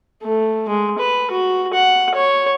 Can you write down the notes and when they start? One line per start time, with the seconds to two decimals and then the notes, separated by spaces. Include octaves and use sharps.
0.23 A3
0.68 G#3
0.98 B4
1.31 F#4
1.73 F#5
2.15 C#5